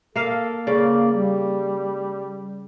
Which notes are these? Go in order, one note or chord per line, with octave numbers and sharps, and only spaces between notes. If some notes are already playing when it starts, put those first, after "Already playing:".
A#3 A4 F5
C#3 A#3 D5
G3